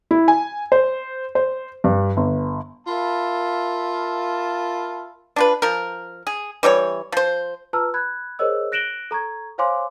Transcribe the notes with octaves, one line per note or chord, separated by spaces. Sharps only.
E4
G#5
C5
C5
G2
G1
F4 A#4 E5 F5 A5 B5
D4 F4 B4
F3 A#4
G#4
E3 G3 A4 C#5
F3 C5
F4 B4 A5 A#5 E6 F6
B5 F#6 G#6
G#4 A#4 C5 C#5 D#5 E6
F#6 A#6 D7 E7 F#7 G7
A4 A#5 C#6 G#6
C5 C#5 F5 G#5 C6 D6